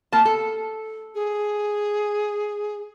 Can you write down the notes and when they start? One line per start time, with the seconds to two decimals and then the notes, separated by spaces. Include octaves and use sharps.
0.12 A#3 A5
0.25 A4
1.15 G#4